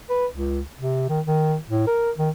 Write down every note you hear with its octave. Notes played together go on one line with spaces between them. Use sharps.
B4
C#2
C3
D#3
D#3
A2
A#4
D#3